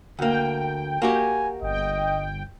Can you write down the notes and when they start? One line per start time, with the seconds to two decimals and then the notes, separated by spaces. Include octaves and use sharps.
0.19 D2 A#3 G5
1.02 A#3 F#4 G4 G#5
1.62 G1 D#5 G5